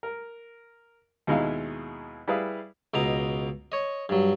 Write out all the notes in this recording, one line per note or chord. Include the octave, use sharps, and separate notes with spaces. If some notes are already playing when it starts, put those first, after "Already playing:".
A#4
D#2 B2 G#3 D#4 E4 F5
G3 E4 G#4 B4 F5 D#6
C#2 B2 D#5 A#5
C#5 D#5
G2 F#3